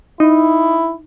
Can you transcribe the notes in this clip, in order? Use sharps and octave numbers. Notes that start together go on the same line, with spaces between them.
D#4 E4